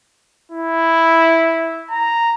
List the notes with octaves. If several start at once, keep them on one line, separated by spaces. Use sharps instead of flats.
E4
A#5